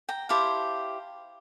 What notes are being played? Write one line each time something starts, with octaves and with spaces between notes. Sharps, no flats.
G5 A#5
E4 G4 C5 F5 A5